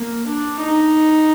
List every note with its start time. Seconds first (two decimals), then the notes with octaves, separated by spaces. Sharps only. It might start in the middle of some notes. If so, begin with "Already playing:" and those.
Already playing: A#3
0.26 D4
0.60 D#4